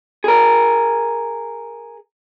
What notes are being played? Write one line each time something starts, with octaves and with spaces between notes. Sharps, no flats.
G#4 A#4